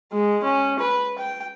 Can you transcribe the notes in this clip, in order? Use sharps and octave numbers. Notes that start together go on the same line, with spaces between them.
G#3
C#4
B4
G5